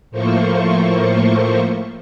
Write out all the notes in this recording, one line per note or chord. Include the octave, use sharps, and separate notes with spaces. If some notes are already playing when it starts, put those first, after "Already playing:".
A2 F3 A3 A#3 C5 C#6